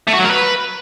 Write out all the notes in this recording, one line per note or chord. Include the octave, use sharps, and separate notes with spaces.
A3
F#4
F#3
A#4
B4